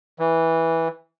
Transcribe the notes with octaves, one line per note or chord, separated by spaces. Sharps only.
E3